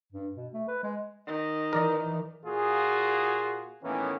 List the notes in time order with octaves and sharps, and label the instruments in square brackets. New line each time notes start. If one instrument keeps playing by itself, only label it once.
[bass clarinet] G2
B2
A3
B4
G#3
[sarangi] D#3
[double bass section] E3 [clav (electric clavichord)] A#4 D5 D#5
[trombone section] A#2 F4 F#4 G#4
A2 D#3 E3 A#3 B3 C#4